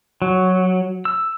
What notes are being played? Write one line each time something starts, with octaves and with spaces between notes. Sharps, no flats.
F#3
E6